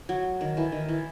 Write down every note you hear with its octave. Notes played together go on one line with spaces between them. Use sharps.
F#3
D#3
E3
D#3
E3